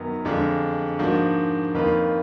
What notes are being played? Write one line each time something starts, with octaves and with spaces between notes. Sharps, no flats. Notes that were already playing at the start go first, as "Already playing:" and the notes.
Already playing: F#2 D#3 F#3 B3
F2 D3 G#3 D4 F4
G#2 F3 A#3 D4 F#4
F2 D#3 A#3 F4 B4